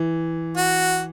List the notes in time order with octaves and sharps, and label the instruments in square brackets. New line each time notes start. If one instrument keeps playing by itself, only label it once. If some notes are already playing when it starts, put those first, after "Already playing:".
Already playing: [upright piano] E3
[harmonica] F#4